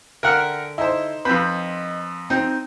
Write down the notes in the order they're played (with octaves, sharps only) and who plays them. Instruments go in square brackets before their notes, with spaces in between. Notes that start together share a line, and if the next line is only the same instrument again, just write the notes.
[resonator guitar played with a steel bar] D3 E5 G5 [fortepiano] A#4 F#5 F6
[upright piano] D#4 C5 [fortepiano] E4
[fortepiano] F2 B4 [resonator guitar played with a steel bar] C4
[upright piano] C4 [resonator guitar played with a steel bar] D#4 C5